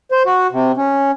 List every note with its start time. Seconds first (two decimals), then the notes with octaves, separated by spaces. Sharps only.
0.11 C5
0.26 F#4
0.52 C3
0.77 C#4